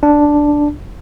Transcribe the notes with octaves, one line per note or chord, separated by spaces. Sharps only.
D4